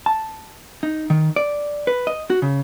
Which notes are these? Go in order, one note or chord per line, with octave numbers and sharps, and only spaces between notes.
A5
D#4
D#3
D5
B4
D#5
F#4
C#3